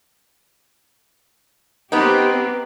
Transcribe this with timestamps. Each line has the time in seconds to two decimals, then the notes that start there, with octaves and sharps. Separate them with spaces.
1.92 B3 C4 D#4 G4